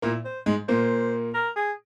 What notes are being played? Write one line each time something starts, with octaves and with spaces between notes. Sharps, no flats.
A#2 A#3 E4
C5
G#2 G#3
A#2 A#3 C5
A#4
G#4